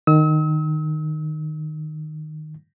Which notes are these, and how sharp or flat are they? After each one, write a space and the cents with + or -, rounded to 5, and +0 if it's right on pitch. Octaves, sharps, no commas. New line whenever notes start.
D#3 -15 E6 -45